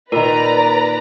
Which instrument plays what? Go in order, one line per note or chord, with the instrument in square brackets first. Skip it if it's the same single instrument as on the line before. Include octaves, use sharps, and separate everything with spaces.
[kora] A#2 D#3 [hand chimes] A#4 [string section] B4 D5 A#5